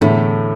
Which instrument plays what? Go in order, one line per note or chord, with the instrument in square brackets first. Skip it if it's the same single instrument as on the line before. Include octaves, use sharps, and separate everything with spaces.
[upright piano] E2 D3 A3 [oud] A2